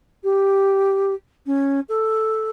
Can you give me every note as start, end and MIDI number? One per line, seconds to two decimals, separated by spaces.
0.23 1.14 67
1.46 1.80 61
1.89 2.50 69